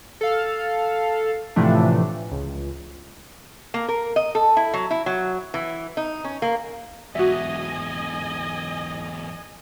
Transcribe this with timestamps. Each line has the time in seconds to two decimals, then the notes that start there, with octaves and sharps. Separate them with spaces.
0.21 A4 F5
1.56 A2 C3 E3 F3 A3 D4
2.31 C#2
3.74 A#3
3.89 A#4
4.16 D#5
4.35 A4
4.57 E4
4.74 F#3
4.91 E4
5.06 F#3
5.54 E3
5.97 D#4
6.24 C#4
6.42 A#3
7.15 E2 G#2 F#4 D#5 E5 G#5